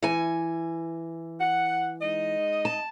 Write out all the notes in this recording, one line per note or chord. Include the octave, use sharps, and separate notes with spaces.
E3 G#5
F#5
G#3 D#4 D#5
A5